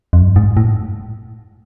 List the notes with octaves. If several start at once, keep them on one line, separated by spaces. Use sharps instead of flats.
F2
F#2
G2
G#2
A2